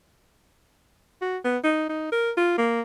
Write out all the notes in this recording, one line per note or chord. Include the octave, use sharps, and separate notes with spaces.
F#4
B3
D#4
D#4
A#4
F4
A#3